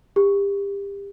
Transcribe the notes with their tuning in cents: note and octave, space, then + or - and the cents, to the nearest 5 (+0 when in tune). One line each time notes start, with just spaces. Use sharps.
G4 +30